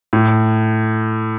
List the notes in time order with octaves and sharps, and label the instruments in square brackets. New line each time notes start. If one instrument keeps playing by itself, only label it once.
[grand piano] A2